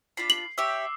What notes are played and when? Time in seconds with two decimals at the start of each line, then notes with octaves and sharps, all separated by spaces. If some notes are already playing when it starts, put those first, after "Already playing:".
0.17 D4 F4 B5 C7
0.30 F#7
0.58 G4 C#5 E5 D6 E6